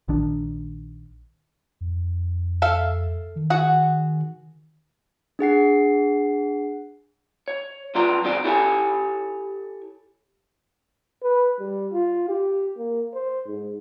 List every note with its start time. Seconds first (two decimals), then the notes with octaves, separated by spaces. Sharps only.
0.08 A#1 D#3 D4
1.81 F2
2.62 A4 E5 F5
3.36 D#3
3.50 F#4 G#4 F#5
5.39 D4 G#4 F#5 C7
7.48 C#5
7.95 F#3 F4 B4 D5 A#5 C6
8.24 D#3 G#3 C4 F#4 D5
8.44 E4 G4 A4 C#5 F5 G#5
11.23 B4
11.60 G3
11.93 F4
12.29 G4
12.78 A#3
13.14 C5
13.47 G#2